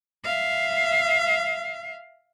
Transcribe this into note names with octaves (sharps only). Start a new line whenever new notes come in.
E5 F5